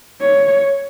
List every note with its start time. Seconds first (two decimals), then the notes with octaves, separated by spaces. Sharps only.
0.21 C#5